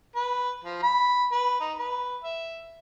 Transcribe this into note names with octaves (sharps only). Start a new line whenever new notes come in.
B4
F3
B5
B4
D#4
B4
E5